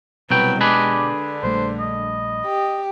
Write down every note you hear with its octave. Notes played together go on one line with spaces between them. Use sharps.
C2 B2 F#3 B4 G5
G#3 D4 G4 G#4 B4
D3
A#1 G3 A3 C5
D#5
G4